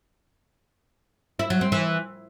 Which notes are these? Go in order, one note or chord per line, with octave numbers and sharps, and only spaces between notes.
E4
F#3
C4
E3